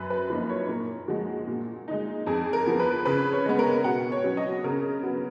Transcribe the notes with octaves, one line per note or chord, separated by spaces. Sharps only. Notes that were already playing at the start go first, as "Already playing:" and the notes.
Already playing: F#2 B4
B4
F3 A#3 D#4 B4
C#5
A#2 A#4
F3 G#3 F#4
A#2
G#3 D#4
F2 G#4
A#4
F3 B3
B4
C#3 B4
C#5
G#3 B3
A#4
B2 F#5
C#5
F#3 C#4
D#5
C#3 A#4
F#3 B3